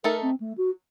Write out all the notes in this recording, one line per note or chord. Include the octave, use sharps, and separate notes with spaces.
A3 D#4 A4 A#4
C4
A3
F#4